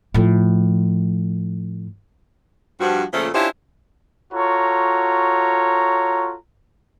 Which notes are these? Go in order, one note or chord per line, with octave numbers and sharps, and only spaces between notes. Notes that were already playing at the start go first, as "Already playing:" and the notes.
A2 F3
G2 F3 F#4
A#2 C#3 F3 A3
C#4 D4 E4 F4 G4 C5
F4 F#4 A4 C#5 A#5